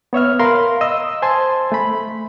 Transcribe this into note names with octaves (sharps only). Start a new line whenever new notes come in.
B3 C#5 E5 F6
A#4 F5 B5 C6
D#5 E6
C5 G#5 A5 C6
A3 B5